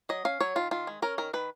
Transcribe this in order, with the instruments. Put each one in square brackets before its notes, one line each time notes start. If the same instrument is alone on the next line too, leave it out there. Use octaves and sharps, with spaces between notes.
[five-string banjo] F#3 D#5
C#4 F5
F#3 C#5
D#3 F4
D#3 F4
G#3
C#4 A#4
D#3 A#4
D#3 B4